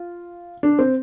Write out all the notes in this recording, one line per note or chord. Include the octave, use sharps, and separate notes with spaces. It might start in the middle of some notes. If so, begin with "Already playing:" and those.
Already playing: F4
D4
C4